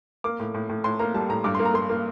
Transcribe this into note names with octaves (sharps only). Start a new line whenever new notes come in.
A#3 D6
A2
A2
A2
A2 C6
A#3 A#5
G3 A5
A2 A#5
G2 D6
A#3 C6
A#5
A#3 C6
A#3